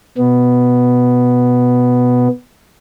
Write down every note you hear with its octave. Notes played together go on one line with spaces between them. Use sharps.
B2 B3